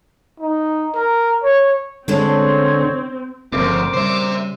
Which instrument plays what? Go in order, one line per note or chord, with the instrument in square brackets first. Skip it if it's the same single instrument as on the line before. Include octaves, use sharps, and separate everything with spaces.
[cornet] D#4
A#4
C#5
[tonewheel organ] D3 [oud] G#3 C#4 A4 [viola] C4 [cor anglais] C#5
[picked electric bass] G1 C#3 F3 [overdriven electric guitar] D2 G#2 [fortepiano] A#3 C4 [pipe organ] D6
[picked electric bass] C#3 G3 [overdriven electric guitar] C5 E5